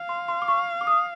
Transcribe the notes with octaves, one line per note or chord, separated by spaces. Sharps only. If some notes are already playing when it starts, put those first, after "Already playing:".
Already playing: F5
C6
C6
D6
C#6
D6
D#6